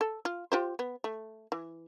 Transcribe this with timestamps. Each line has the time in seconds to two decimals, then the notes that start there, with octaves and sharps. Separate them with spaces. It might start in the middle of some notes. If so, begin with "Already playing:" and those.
0.01 A4
0.25 F4
0.52 F4 G4 C5
0.79 B3
1.04 A3
1.52 E3